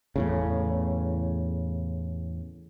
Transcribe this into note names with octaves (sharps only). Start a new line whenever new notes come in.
E2 A2 C#3